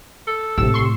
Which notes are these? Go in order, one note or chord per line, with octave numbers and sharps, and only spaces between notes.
A4
G#1 A2 C3 G4 E6
C6 C#6